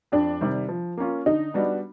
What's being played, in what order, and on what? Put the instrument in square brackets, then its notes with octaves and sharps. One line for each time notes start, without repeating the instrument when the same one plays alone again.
[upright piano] F2 [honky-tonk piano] D4
[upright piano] C3 D#3 G3
F3
A#3 C#4 F4
[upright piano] D3 [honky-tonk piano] D#4
[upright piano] G3 B3 D4 F#4